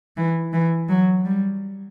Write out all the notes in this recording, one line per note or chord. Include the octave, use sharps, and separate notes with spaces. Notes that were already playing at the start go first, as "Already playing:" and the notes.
E3
E3
F#3
G3